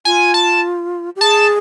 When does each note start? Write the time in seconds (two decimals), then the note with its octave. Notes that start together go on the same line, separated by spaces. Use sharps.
0.05 F4 G#5
0.34 A5
1.16 G4
1.21 G#4 A5